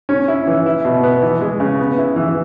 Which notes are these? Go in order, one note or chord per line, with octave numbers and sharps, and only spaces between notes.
C#4
E4
E3
E4
B2
B3
E3
G#3
C#3
B3
E4
E3